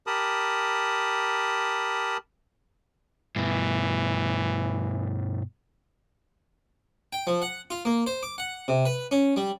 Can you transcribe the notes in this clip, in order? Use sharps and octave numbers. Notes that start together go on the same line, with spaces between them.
G4 A#4 A5 B5 D#6
G2 B2 E3
G5
F3
F#5
F4
A#3
C5
D6
F#5
C3
B4
C#4
G3